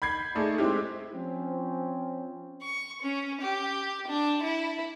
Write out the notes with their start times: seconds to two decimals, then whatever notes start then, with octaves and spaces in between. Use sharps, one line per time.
0.02 B5 G6 G#6 C7
0.35 A3 D#4 G#4 D5
0.58 G#3 C4 E4 G4
1.14 F3 C4 C#4
2.62 C#6
3.02 C#4
3.41 G4
4.08 D4
4.43 E4